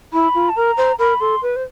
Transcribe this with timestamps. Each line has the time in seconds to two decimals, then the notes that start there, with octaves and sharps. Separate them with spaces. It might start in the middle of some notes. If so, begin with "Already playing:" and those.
0.13 E4 B5
0.35 F4
0.49 A5
0.56 A#4 A#5
0.77 C5
0.99 A#4 B5
1.20 A4 C6
1.42 B4
1.56 C5